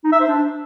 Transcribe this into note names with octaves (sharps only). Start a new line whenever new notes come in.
D#4
E5
C5
D4